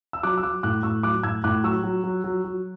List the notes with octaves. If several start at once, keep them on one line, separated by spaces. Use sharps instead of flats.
E6
F#3 D6 F#6
E6
F#3 D6 F#6
A2 D6 F#6
A2 C#6 E6
F#3 D6 F#6
A2 E6 G#6
A2 D6 F#6
F#3 C#6 E6
F#3
F#3
F#3
F#3